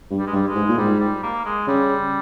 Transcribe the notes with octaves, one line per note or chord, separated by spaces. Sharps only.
G2
G3
G#3
G2
G3
G#3
G#2
A#2
G#2 G3
G3
A#3
G#3
C#3 G3